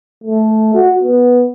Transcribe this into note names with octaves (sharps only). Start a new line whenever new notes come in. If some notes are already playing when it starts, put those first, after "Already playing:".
A3
F#4
B3